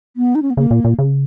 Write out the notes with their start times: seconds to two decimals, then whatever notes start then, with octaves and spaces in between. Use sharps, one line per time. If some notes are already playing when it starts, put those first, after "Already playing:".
0.16 B3
0.35 D#4
0.42 C#4
0.50 B3
0.57 C#3 A#3
0.71 A#2
0.84 A#2
0.99 C#3